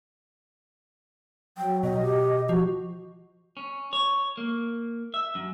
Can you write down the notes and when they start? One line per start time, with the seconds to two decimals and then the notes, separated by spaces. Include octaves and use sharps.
1.58 F#3 G5
1.83 B2 D#5
2.02 G4
2.49 F3 F#4
3.57 C#4
3.93 C#5
4.37 A#3
5.14 E5
5.35 F#2